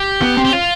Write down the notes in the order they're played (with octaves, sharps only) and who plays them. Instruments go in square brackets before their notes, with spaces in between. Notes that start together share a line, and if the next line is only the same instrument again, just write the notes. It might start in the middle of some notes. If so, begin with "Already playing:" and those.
Already playing: [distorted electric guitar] G4
[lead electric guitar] B3
C4
[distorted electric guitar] G4
F4